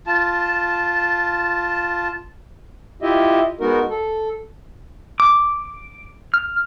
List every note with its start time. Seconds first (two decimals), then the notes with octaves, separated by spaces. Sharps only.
0.07 F4 A5
3.02 E4 F4 G4 D#5 E5
3.60 G#3 B3 D#4 F#4 A#4
3.90 A4
5.20 D6
6.34 F6